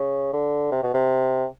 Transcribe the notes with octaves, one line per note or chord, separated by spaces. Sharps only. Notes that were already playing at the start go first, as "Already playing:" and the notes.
Already playing: C#3
D3
C3
B2
C3